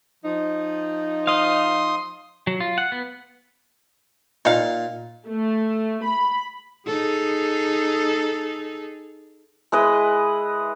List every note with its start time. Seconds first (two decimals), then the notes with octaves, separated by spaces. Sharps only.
0.24 F3 D#4
1.27 D#5 F5 C6 D#6
2.47 F#3
2.60 F4
2.78 F#5
2.92 B3
4.45 A#2 D#4 F5
5.28 A3
6.06 B5
6.87 D#4 G#4 A4
9.72 G#3 E4 B4 D#5